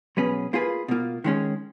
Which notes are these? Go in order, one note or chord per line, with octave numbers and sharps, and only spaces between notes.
B2 F#3 C#4 G#4 B4
A#3 F4 G#4 B4
B2 A#3 F4
D#3 G#3 C#4 G#4